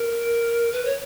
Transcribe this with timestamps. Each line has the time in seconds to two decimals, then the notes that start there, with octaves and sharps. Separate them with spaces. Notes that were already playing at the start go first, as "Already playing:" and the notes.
Already playing: A#4
0.73 B4
0.85 C#5